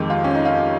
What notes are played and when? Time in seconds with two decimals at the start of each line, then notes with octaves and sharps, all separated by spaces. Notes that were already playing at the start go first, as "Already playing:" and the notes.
Already playing: F2 D#3 G#3 G4
0.10 F4
0.24 C#4
0.35 D#4
0.45 F4